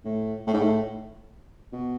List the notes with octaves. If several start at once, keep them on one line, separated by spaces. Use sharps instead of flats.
A2
A2
G#2
A2
B2